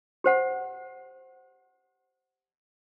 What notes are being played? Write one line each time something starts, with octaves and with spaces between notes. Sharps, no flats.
G4 C5 F#5